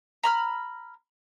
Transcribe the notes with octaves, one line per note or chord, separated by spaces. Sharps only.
A#5 B5 F6